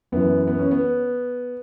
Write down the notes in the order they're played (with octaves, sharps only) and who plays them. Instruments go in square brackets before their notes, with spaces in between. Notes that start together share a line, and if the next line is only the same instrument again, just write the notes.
[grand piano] F#2 E3 B3
B3
C#4
B3